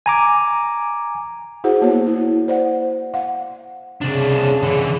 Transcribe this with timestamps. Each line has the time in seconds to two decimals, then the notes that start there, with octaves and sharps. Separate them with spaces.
0.06 G#5 A#5 D6
1.64 E4 F#4 G#4 C5 F#5
1.82 A#3 B3 F#4 C#5
2.07 E4
2.48 C5 D5 F#5
3.14 F5 F#5
4.01 C2 C#3 D4
4.63 D3 E3